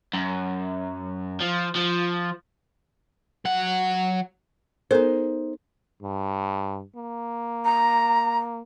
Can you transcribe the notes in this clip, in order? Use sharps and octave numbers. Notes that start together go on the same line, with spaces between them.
F#2
F3
F3
F#3 F#5
B3 D#4 A4 A#4 C5
G2
A#3
A#5